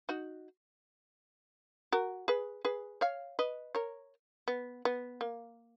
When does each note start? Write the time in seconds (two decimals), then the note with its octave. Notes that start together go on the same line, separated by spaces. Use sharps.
0.09 D#4 F#4
1.92 F#4 A#4
2.28 G#4 B4
2.65 G#4 B4
3.01 C#5 F5
3.39 B4 D#5
3.75 A#4 C#5
4.48 B3
4.85 B3
5.21 A#3